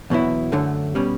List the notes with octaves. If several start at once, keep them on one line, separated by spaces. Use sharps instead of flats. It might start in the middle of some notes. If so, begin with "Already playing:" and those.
E2 B2 F#3 B3 E4
F#2 D3 F#3 A3
B2 G3 C#4